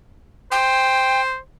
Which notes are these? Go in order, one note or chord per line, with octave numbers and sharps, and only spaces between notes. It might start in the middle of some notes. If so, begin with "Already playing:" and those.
C5 G5